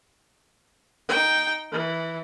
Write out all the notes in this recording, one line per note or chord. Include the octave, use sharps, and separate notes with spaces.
D#4 G5
E3